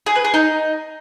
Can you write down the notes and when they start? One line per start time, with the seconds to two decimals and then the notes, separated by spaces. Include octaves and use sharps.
0.06 G#4
0.16 B4
0.25 G#4
0.34 D#4